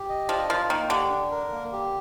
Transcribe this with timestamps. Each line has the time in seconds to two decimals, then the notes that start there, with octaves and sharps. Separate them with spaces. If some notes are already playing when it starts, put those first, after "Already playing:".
Already playing: G4
0.09 D#5
0.29 F3 D4
0.49 F3 A#4
0.69 D#3 A#3
0.90 D3 G4
1.10 D4
1.31 A#4
1.52 A#3
1.72 G4